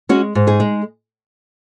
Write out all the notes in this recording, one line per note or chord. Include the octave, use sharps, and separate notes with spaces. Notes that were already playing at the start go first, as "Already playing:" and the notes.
G#3 C#4 F#4
G#2
D#4 G#4
G#3